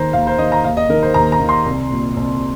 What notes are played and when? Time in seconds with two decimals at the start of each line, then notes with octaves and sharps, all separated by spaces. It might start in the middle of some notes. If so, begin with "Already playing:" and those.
Already playing: D#2 D#3 C5 A#5
0.13 D#2 F5
0.27 C5
0.38 D#3 D#5
0.52 A#5
0.64 D#2 F5
0.77 D#5
0.89 D#3 A#4
1.02 C5
1.14 D#2 A#5
1.32 A#5
1.40 D#3
1.49 C6
1.66 C2
1.91 A#2
2.17 C2